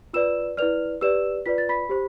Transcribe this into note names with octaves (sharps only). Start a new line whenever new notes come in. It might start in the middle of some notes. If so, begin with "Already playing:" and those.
F4 B4 D5 E6 E7
E4 B4 D5 F6 F7
G4 B4 D5 E6 E7
F4 B4 D5 B6
A6
B5 B6
G4 C5